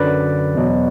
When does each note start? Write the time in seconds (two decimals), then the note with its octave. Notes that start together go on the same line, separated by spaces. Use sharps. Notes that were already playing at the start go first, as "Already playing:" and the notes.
Already playing: F#2 D3 F#3 B4 D5
0.54 E2 B2 F#3